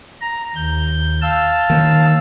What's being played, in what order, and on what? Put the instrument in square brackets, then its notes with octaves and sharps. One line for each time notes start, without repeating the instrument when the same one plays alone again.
[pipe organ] A#5
D#2 G6
F5 A5 E6
[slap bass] D#3 A#3